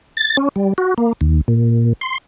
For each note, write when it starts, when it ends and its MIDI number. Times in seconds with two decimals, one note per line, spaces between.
0.17 0.37 93
0.37 0.49 61
0.56 0.73 55
0.78 0.94 66
0.98 1.13 58
1.21 1.41 39
1.48 1.93 46
2.01 2.18 84